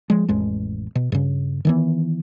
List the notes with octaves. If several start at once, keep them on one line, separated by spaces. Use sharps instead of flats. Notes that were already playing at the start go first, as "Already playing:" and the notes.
F3 G#3
A1 F2 G#3
B2
G2 C#3
D#3 E3 B3